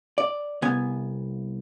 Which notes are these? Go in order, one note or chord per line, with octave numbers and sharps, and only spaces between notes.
D5
C2 B3 G#5